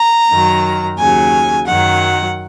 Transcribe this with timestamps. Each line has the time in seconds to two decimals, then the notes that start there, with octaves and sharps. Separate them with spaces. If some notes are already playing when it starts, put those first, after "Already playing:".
Already playing: A#5
0.29 F#2 D#3 F#3
0.98 D#2 C#3 F#3 G#5
1.67 F#2 D#3 F#3 F#5